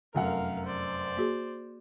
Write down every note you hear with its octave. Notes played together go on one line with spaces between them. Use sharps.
F1 F#2 A#4 F5 F#5
C5 D5
A#3 F#4 G#4